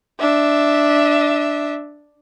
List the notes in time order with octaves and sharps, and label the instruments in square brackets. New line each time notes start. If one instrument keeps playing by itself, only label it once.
[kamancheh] D4 E5